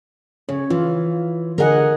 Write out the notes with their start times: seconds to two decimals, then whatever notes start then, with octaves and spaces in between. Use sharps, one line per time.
0.49 C#3 C#5
0.70 E3 F4
1.58 D3 G#4 A#4 D#5 F#5 G#5